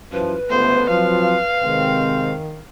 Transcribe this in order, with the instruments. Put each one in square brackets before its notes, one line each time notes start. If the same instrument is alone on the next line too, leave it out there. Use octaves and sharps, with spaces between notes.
[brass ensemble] F#2 E3 F3 [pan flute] B4
[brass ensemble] G1 C#2 A3 [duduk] B3 [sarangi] C5
[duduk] F3 [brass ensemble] F#3 C4 F4 [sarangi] F5
[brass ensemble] C3 G#3 C4 [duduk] D#3